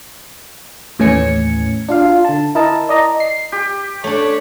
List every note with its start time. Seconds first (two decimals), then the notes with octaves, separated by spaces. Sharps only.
0.99 D#2 A2 E3 C#4 G#6 C#7
1.89 D4 F4 F5
2.05 F4
2.25 D3 A5
2.55 E4 A#4 D#5 A5
2.89 D5 D#5 A#5
3.20 C7
3.52 G4
4.04 A3 D4 C#5